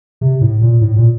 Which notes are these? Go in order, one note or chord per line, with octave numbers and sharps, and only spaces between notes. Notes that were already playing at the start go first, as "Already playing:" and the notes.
C3
A2
A#2
A2
A#2